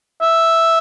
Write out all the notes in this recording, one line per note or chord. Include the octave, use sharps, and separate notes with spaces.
E5